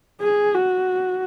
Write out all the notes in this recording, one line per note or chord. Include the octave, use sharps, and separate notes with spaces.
G#4
F#4